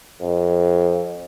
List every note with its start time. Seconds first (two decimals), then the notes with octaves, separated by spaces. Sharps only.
0.22 F2